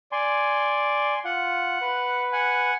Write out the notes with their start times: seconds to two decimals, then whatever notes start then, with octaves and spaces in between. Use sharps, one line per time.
0.12 D5 G#5 C6
1.25 F4 F#5
1.81 B4
2.33 F#5 G#5